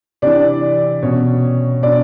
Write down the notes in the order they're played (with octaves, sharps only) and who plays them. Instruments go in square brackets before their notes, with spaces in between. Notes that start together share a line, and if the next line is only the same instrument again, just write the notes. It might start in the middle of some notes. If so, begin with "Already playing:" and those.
[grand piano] C3 E3 D4 D5
B2 C#4 C#5
B2 D4 D5